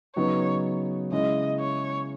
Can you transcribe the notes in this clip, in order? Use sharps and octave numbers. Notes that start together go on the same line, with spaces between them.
C#3 F#3 B3 D#4 C#5
C#3 G#3 C#4 E4 D#5
C#5